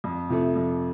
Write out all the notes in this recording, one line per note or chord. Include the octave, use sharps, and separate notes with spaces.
F2
C3 F3 A3
F2